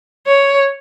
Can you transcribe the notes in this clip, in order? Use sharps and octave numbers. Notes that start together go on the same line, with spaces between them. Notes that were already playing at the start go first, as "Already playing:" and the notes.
C#5